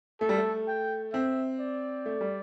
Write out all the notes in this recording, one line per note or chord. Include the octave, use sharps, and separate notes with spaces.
A3 A4
G3
A3
G5
C4 E5
D5
A3
G3